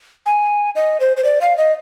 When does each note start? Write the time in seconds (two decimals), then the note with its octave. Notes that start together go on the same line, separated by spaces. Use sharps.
0.26 G#5
0.75 D#5
1.00 C5
1.17 C5
1.24 D5
1.41 F5
1.58 D#5